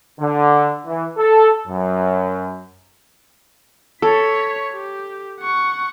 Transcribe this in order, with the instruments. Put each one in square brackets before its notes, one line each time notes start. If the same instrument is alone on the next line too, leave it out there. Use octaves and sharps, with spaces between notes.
[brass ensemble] D3
E3
A4
F#2
[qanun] A4 [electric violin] C#5 B6
[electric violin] G4
F#5 C#6